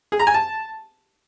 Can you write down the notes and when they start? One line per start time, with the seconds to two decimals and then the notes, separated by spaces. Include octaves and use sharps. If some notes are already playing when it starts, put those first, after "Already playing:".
0.12 G#4
0.19 A#5
0.27 G#5
0.34 A5